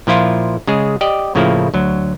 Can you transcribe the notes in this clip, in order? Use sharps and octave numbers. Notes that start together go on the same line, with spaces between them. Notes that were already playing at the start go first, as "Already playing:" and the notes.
A#2 F3 E4 F4
C#3 G#3 G#4
G4 D5 D#5
A2 C#3 F3 A#3 E4
D2 F#3